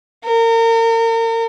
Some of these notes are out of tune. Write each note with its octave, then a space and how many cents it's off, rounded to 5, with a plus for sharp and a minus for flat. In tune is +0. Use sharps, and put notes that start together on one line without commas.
A#4 -35